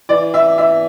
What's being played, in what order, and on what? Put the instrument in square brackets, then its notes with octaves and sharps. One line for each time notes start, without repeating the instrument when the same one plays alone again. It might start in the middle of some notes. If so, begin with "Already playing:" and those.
[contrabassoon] E3 [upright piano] D5
[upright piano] E5
E5